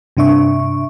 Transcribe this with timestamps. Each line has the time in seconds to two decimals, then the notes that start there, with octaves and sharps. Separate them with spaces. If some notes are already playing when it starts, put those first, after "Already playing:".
0.17 G2 C3 D4 E5 C#6